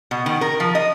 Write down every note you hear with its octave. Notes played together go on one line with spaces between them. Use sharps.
B2
D#3
A#4
F3
D#5